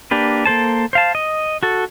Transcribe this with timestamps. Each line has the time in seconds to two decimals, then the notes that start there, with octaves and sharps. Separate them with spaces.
0.11 A#3 D4 G4 B4
0.46 A#3 A4 C5 A5
0.93 C5 F5 A5
1.15 D#5
1.63 F#4 A4